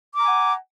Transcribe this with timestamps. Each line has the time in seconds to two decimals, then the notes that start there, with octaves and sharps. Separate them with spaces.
0.14 D6
0.18 A#5
0.23 G#5
0.27 F#5